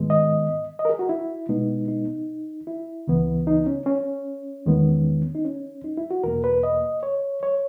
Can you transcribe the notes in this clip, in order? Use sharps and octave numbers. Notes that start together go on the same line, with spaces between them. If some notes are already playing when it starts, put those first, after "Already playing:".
Already playing: G#2 D#3 G#3 B3
D#5
D#5
A#4
G#4
F#4
E4
B2 G#3 B3 D#4
D#4
E4
C#2 C#3 E3 B3
D#4
C#4
C#4
E2 D#3 G#3 B3
D#4
C#4
D#4
E4
F#4
E2 B2 A#3 A#4
B4
D#5
C#5
C#5